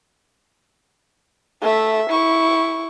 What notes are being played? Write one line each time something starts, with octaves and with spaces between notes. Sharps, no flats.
A3 E5
E4 C#6